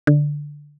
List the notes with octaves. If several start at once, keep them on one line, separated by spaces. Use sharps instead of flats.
D3